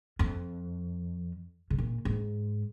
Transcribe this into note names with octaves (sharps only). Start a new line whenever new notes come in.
F2
C#3
A#2
G#2